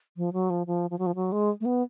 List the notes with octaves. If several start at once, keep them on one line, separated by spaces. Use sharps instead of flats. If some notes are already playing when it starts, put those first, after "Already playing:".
F3
F#3
F3
F3
F3
F#3
F3
F#3
G#3
A3
B3